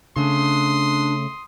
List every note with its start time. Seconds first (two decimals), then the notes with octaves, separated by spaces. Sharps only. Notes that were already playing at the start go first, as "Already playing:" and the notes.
0.16 C#3 A3 D4 C6 D#6